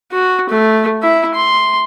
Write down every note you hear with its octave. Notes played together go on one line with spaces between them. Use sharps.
F#4
A3
E4 E5
C6